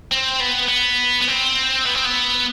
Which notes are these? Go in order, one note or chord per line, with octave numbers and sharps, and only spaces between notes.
C4
B3
B3
B3
C4
B3
C4
B3